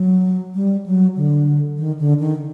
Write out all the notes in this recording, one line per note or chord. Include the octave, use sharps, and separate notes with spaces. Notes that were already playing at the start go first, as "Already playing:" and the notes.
Already playing: F#3
G3
F#3
D3
D#3
D3
D#3